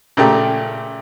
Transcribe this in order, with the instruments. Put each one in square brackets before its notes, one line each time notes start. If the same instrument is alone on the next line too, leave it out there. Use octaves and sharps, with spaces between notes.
[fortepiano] A#2 C#3 A3 G4